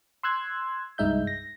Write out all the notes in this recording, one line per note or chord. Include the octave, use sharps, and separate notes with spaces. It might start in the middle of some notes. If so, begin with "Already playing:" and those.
C6 E6 F#6 G#6
C2 G2 G#3 D#4 E5 G6
A#6